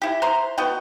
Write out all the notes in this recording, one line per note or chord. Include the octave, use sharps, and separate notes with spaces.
E4 G4
C5 A#5 C6
B3 F#4 D#5 G5